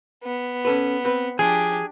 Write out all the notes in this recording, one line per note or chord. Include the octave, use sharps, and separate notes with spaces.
B3
C#4 A4 B4
C4 B4
F3 D4 G4 G#4